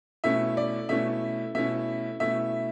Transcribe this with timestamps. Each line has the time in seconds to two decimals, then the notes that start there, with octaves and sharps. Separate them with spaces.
0.24 B2 A3 C#4 E4 E5
0.57 D5
0.89 B2 A3 C#4 E4 E5
1.55 B2 A3 C#4 E4 E5
2.20 B2 A3 C#4 E4 E5